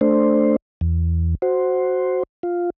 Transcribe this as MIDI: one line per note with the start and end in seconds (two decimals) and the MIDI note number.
0.01 0.56 57
0.01 0.56 62
0.01 0.56 72
0.81 1.35 40
1.42 2.23 66
1.42 2.23 72
2.43 2.70 65